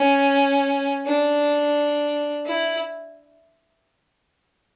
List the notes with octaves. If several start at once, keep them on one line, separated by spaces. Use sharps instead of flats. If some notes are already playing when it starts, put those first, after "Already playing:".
Already playing: C#4
D4
E4